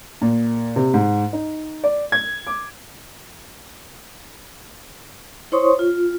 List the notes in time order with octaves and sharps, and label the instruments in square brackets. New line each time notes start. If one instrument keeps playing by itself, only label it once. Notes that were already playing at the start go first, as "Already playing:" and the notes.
[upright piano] A#2
C3
G#2
D#4
D5
G#6
D6
[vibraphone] E4 C5 C#5 C6 C#6 D#6
F4